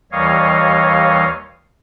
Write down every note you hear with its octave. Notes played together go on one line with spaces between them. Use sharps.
D#2 E3 G3 C#5 D#5 F5